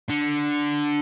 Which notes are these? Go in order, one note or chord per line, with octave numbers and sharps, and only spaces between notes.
D3